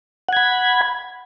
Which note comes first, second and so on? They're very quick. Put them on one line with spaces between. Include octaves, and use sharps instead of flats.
F#5 G#6 B5